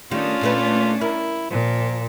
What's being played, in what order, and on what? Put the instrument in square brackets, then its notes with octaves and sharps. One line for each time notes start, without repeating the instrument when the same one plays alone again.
[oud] D#3 G3 A3 [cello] C#4 D4 [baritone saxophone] F4
[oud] A#2 A3 B4
[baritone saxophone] E4 [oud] A#4
[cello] A#2 [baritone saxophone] F3